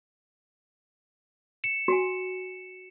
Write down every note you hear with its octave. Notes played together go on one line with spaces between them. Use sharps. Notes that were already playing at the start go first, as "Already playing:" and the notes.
C#7 E7
F#4 G#5